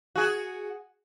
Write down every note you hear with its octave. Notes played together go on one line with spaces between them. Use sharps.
F#4 G#4